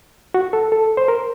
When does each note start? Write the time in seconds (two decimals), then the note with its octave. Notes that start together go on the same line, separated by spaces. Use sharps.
0.34 F#4
0.53 A4
0.72 A4
0.97 C5
1.08 A#4